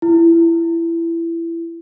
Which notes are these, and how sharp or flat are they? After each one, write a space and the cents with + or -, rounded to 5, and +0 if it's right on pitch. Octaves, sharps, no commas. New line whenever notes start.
E4 +20